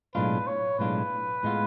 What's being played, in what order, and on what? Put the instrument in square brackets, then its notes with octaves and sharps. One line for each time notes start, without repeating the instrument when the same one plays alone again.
[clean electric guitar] B1 A2 G#3 D4 F4 [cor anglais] B4
[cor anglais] C#5
[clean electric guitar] B1 A2 G#3 D4 F4 [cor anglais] B4
[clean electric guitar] A2 G#3 B3 F4